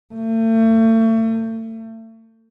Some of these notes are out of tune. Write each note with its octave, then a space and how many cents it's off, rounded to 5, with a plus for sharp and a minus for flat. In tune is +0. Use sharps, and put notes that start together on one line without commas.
A3 +35